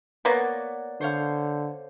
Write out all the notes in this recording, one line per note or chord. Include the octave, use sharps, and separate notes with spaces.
A#3 B3 C#5 D5 F#5
D3 C5 C#5 F5